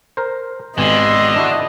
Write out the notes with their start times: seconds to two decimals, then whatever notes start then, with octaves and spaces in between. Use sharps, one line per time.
0.17 A#4 C5
0.78 G#1 B2 D3 G3 D#5 G#5 C6
1.36 D4 E4 F#4